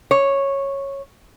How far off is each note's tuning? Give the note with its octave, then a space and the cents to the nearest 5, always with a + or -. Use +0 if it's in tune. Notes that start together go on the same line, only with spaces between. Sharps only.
C#5 -10